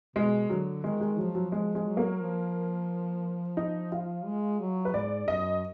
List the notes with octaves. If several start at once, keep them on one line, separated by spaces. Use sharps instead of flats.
B2 G#3
D3 F#3
D#3 G#3
G#3
F3 F#3
F#3
F3 G#3
G#3
F#3
A#3
F3
D#4
F4
G#3
F#3
B4
G#2 D5
F#2 D#5